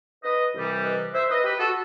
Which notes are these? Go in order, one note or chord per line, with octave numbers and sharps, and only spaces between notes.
B4 D#5
C2 C3 E3 G3
B4 D#5
C5 E5
B4 D#5
G4 B4
F#4 A4